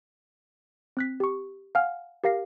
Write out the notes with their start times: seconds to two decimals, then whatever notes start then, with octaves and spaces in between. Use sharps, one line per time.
0.97 C4 F#6 B6
1.20 G4 C#6
1.75 F5 F#5 G#5 F6
2.24 G4 A#4 F5 A#6 C7